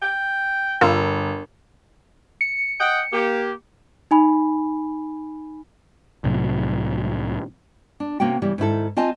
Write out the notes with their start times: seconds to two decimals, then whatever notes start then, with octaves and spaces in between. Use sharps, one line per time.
0.02 G5
0.81 G1 F4 A#4 A#5 B5
2.41 C#7
2.79 D#5 F#5 G5
3.13 A#3 G4
4.11 D#4 G#5 B5
6.24 C2 A2 C3 F#3
8.00 D4
8.20 C3 A#3 C#4 F#4 G5
8.42 C#3 E3 G3
8.58 G#2 D#3 E4 A4
8.97 C4 F4 D#5 G#5 A5